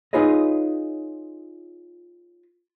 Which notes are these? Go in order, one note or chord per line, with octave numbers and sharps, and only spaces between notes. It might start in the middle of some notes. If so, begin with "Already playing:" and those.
D#4 F4 G#4 B4 C#5 D#5